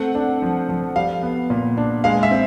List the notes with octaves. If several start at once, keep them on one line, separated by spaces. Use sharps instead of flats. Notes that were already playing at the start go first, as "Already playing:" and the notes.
Already playing: A3 C4 F#5
D4
F3
F3
G3 F5
B3
A#2
D4
G#3 F5
E5
C4